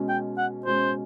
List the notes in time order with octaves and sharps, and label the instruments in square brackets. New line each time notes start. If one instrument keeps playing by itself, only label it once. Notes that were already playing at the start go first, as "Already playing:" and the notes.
Already playing: [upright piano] B2 G#3 C#4
[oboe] G5
F#5
[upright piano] B2 G#3 C#4 [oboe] C5